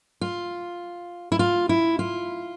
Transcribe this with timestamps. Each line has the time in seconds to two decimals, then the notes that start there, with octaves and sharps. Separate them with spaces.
0.21 F4
1.32 E4
1.39 F4
1.69 E4
1.99 F4